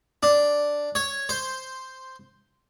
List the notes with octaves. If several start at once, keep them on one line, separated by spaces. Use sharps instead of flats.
D4
C#5
C5